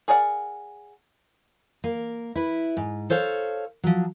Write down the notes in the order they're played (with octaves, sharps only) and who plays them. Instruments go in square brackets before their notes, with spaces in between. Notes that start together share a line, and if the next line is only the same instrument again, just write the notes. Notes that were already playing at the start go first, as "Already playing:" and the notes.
[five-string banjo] G#4 A#4 D5 F#5
[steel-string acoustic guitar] A#3
E4 B4
G#2
A4 C5 C#5 F5
F3 F#3